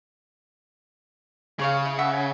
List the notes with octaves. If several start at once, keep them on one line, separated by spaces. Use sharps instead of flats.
C#3 G#4 C#5 F5
E4
E5 F#5
C#5